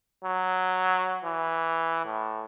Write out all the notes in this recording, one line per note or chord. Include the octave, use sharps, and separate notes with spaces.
F#3
E3
A2